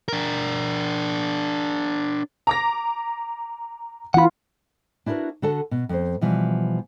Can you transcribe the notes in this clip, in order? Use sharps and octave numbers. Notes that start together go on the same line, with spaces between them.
D4 A#4
A#5 D6 A#6
E3 F4 F#5 B5
D4 E4 F#4 G#4 A#4 B4
D3 F#4 A4 F#5 A5
B2
F2 C5
B2 E3 F3 G3